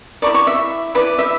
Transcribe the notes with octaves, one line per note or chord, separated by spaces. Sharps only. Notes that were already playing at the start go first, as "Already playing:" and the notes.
E4 A#4 D5 C#6
C#6
E5
E4 B4 D5
E5